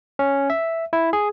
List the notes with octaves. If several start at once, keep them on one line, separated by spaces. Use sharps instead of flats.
C#4
E5
E4
G#4